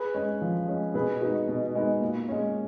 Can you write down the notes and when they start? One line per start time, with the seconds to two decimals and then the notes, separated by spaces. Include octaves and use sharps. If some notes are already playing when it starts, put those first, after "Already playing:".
Already playing: G#4 B4
0.14 G#3 C#4
0.41 F3
0.68 G#3 C#4
0.94 B2 G#4 B4
1.21 G#3 B3 D#4 F#4
1.48 B2
1.75 G#3 B3 D#4
2.01 A#2
2.29 G#3 C#4